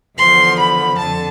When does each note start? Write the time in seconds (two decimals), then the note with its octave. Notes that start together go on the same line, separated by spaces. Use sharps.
0.18 E2 D3 F3 C6
0.59 B5
0.98 F2 D3 A5